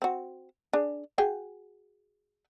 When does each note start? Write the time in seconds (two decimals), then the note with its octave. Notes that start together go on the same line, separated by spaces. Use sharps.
0.02 C4 F#4
0.73 D4 G#4
1.18 F#4 G#4 G5